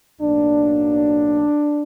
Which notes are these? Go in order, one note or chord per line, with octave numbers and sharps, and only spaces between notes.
B1 A2 F#3 A#3 D4